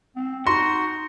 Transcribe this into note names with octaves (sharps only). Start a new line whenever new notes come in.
C4
D#4 F#4 C6